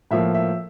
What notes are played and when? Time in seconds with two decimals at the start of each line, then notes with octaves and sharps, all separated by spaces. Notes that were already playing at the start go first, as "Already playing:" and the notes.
0.11 A2 F3 A#3 E5
0.34 E5